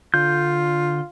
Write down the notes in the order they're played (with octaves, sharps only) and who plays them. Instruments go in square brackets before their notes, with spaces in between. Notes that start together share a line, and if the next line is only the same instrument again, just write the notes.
[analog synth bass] D3 [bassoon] F4 [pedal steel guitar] G6